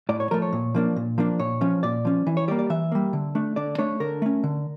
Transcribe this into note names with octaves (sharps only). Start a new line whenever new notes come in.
A2 D5
C#5
F3 A3 A#4
C#5
A#2
F3 A#3 D4
A#2
F3 A#3 D4
A#2 C#5
F3 C#4
A#2 D5
F3 C#4
E3
C#5
G3 A#3 D5
D5
E3 E5
G3 A#3
D3
A3 D4
D3 D5
A3 D4 C#5
D3 A#4
A3 C#4
D3